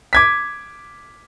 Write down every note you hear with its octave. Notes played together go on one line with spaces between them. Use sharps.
D6 G#6 B6